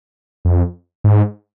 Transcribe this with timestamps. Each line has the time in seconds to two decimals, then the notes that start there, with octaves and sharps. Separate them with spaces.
0.45 F2
1.04 G#2